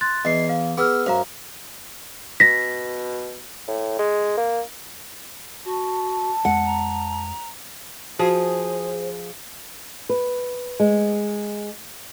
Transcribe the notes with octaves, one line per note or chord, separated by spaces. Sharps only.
C6 F#6 A6
E2 D#5 C7
F5
B3 G#4 E6 F6
F#2 C5 F5 A#5
B2 A#6 B6
A2
G#3
A#3
F#4 A5
F2 G#3 F#5
A#5
F3 F#4 G#4 C5
B4
G#3